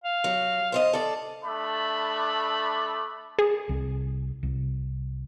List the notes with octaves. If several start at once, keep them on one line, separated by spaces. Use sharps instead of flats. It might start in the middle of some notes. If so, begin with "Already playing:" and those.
F5
F#3
C5 C#5 D#5
A4 D5
A3 D4 B5
G#4
C2
C2